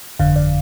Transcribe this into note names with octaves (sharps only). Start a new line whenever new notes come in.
G1 F2 D3 F5
D5